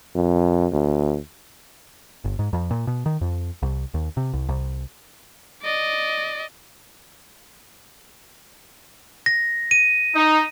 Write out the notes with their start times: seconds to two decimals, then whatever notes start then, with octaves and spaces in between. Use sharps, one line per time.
0.15 F2
0.72 D2
2.24 G1
2.39 G#2
2.53 F2
2.71 A#2
2.87 B2
3.06 D#3
3.21 F2
3.62 C2
3.94 D#2
4.17 C3
4.34 C2
4.49 C2
5.63 D5 D#5
9.26 A#6
9.71 D#7
10.15 D#4